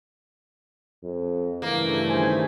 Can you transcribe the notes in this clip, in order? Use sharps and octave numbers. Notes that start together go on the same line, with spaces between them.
F2
G2 C#3 E3 A3 A#3
D#3 C5 G#5